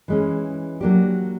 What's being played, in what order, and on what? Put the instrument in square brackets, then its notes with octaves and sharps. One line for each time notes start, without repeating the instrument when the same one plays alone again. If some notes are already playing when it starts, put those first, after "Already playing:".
[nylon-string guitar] E3 G#3 C#4
F#3 A#3 D4 G4